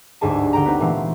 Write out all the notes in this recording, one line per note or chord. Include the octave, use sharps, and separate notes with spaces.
G1 D2 G#2 G#4 A5
D3 G5 A#5
B3 C4 D#4 B4
A#2 E3 G#3 A3 C4